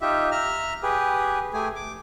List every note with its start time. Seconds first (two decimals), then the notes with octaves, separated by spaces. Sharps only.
0.01 D#4 F4 G4 E5
0.32 E5 A#5 F6
0.83 G4 G#4 B4
1.53 A3 G4 G#4 G#5
1.76 D6